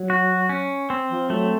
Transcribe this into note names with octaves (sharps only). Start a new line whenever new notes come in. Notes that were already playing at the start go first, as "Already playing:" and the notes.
Already playing: F#3
F#4
C#4
C4
F3
F#3 A3